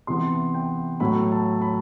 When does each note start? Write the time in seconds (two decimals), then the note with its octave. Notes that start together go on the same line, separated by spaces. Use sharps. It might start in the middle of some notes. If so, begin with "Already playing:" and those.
0.07 C3 E3 B3 C6
0.54 G5
1.00 A2 F#3 A3 B5
1.32 A5
1.61 B5